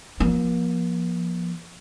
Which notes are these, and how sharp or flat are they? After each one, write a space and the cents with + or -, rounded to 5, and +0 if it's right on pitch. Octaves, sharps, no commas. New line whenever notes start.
F3 +0 A#3 +35